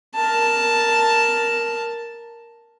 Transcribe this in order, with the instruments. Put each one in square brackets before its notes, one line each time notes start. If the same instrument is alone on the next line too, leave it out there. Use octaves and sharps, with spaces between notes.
[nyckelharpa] A#4 A5